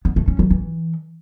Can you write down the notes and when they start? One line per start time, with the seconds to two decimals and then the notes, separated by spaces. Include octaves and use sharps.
0.05 B3
0.16 A3
0.28 C#4
0.39 F#3
0.50 E3